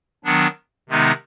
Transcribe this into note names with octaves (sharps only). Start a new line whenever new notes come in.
D#3 F#3 B3 D4
C3 D#3 G#3 B3 D#4